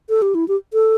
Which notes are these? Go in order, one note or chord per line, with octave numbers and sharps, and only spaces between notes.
A4
G4
E4
G4
A4